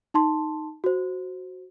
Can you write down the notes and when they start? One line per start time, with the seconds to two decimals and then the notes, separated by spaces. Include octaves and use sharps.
0.14 D#4 A5 C6
0.84 F#4 C5